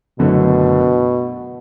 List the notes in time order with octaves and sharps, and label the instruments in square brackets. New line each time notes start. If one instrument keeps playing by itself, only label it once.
[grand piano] F#1 F#2 D3 F#3 A3 [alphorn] B2